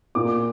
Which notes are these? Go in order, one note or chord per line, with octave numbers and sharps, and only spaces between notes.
A#2 D6